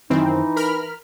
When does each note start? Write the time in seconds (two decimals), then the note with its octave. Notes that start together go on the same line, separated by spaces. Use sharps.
0.10 F#2 D#3 E3 C4 D#4
0.56 A#4 B5 F6